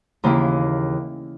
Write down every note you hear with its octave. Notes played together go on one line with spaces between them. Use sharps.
D#2 C#3 E3 A#3 E4